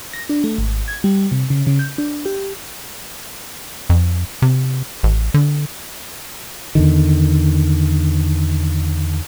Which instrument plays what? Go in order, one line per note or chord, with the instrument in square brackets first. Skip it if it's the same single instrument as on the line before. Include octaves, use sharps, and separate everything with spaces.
[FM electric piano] A#6
D4
A3
G#1
G#6
G3
C3
C#3
C#3
G6
D4
G4
[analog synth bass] F2
C3
A1
D3
[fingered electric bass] E2 D3 D#3